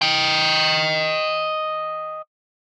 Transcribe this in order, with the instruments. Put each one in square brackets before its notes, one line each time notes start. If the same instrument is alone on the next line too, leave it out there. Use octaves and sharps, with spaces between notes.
[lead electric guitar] D#5 G5